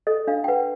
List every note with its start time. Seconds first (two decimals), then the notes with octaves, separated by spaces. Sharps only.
0.07 A4 D#5
0.27 D4 F5
0.44 G5
0.48 B4 F#5